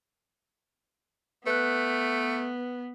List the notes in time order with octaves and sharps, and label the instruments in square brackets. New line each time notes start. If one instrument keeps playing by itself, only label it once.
[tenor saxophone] A3 [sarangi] B3 [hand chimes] B4 F#6